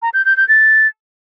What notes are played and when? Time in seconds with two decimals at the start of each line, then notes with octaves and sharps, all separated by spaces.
0.02 A#5
0.14 G6
0.25 G6
0.37 G6
0.49 A6